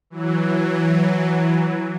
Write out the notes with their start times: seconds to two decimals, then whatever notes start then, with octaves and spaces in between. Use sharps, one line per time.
0.10 E3 F#3